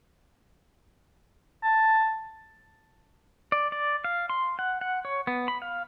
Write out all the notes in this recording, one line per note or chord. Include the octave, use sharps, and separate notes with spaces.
A5
D5
D5
F5
C6
F#5
F#5
C#5
B3
B5
F5